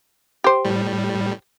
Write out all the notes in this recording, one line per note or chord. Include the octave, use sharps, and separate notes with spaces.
G4 C5
A2 G3